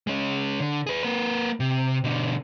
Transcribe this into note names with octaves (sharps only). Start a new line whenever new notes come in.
G#3 C#4
D3
G#4 B4
A#3 B4
C3
B2 D3